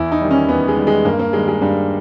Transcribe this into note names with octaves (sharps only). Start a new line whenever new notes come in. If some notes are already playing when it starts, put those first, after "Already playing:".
Already playing: E2 E4
D#4
D#3 G3
C#4
E2 B3
G#3
D#3 G3
G#3
G2 A#3
A#3
D#3 G3 G#3
G#3
G2 G3